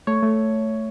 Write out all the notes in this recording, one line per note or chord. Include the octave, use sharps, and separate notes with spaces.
A3 C#5
A3